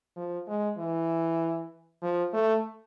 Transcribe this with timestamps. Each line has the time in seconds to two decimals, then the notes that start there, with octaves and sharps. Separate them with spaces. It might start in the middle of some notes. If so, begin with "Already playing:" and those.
0.17 F3
0.48 G#3
0.78 E3
2.02 F3
2.33 A3